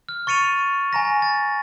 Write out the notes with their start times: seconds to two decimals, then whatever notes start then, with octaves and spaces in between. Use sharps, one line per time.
0.09 F6
0.27 C#6 A6 C#7 D#7 F7
0.93 G#5 A#5 A#6
1.22 A6